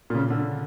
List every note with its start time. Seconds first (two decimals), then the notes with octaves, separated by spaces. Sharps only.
0.10 A#2
0.15 C#3
0.30 D3